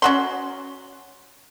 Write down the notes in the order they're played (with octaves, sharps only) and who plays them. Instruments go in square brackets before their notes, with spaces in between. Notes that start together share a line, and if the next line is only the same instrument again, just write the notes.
[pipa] C#4 F#4 C6